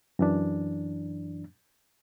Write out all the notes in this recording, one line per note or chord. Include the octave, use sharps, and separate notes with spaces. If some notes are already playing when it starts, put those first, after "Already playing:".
F#2 E3 D4